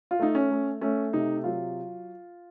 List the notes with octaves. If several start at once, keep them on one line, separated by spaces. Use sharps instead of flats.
F4
A3 D#4
C#4
A3
A3 C#4
C3 D#4
F#3 F4